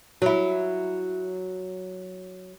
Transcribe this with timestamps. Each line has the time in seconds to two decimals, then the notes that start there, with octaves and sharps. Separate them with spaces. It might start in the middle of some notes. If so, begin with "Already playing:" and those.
0.22 F#3 E4